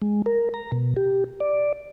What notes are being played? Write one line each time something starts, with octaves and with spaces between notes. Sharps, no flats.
G#3
A#4
A#5
B2
G4
D5